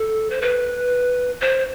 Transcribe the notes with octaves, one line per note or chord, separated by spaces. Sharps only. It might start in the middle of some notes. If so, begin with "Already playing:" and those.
Already playing: A4
C5
B4
C5